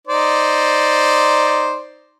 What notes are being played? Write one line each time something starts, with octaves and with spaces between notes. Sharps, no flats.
D#4 C5 D5